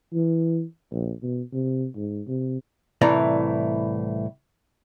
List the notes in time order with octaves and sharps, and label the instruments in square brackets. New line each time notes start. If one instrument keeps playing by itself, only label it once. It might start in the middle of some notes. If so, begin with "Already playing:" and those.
[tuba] E3
A#1
B2
C3
G#2
C3
[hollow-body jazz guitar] C2 A2 E3 D#4 D5 A#5